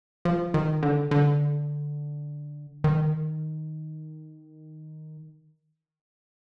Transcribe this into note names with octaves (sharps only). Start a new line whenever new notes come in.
F3
D#3
D3
D3
D#3